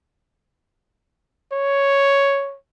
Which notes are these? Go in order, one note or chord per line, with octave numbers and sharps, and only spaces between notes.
C#5